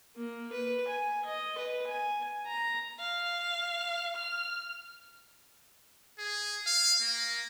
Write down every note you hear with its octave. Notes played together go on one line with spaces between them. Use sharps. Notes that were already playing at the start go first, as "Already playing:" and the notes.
A#3
B4
G#5
D#5
B4
G#5
A#5
F5
F6
G#4
F5
A#3